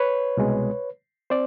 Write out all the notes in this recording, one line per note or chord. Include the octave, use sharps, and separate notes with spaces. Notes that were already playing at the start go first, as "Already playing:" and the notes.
Already playing: B4 C#5
C2 B2 G#3
C4 C5 D5